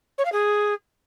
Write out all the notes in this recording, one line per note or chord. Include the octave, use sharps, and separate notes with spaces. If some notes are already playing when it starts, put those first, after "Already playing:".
C#5
F5
G#4